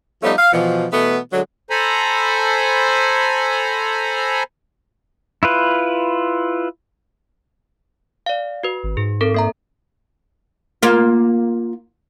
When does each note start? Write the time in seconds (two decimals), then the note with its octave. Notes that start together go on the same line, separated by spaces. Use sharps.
0.23 F3 G3 A3 B3 C#4 D#4
0.37 F5
0.52 B2 E3 F3
0.92 B2 E3 A3 B3
1.32 D3 F#3 G#3
1.70 A4 C5 G#5 A#5 B5
5.43 E4 F4 B4
8.26 D5 F5
8.63 F#4 B4
8.84 G#1
8.97 G#2 G#4
9.21 C4 A4 A#4
9.34 A#3 E5 A#5
10.83 A#3 F4